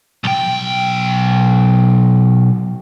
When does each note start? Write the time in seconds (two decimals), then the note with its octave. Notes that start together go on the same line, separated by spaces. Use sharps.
0.24 B1 G5